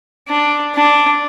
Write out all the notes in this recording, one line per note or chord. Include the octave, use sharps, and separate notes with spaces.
D4
D4